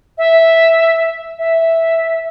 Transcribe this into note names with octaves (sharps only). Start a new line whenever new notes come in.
E5
E5